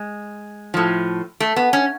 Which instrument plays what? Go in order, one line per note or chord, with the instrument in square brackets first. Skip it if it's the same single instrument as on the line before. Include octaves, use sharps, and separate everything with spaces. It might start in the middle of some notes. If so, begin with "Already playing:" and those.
Already playing: [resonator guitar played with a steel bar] G#3
A2 F3
A3
B3
C#4